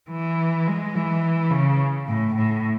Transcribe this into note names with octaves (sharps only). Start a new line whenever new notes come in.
E3
G#3
E3
C#3
A2
A2